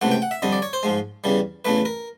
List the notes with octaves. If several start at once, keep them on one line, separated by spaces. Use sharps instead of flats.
C#2 C3 E3 A3 F#5
G5
F#5
E5
F2 D3 G3 D#5
D5
C#5
C5
G#2 F3 G#3
E2 C#3 E3 G3
E2 C#3 E3 A3 B4
A#4